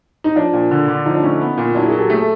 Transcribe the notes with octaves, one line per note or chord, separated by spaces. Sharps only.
D#4
F3 D4
A#2
D3
D3
F3 D#4
D4
A3 C#4 D#4
B3
A#2
F#3 D4 E4
G#4 A#4
F#3
G4 A4
A3 G#4
A4